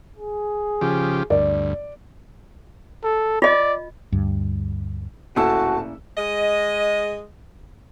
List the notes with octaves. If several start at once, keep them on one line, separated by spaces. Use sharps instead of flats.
G#4
C#3 F3 G4
D2 G2 D5
A4
F4 D5 D#5
D2 G2
D1 A#2 C#4 E4 F#4 A4 A5 E6
G#3 D#5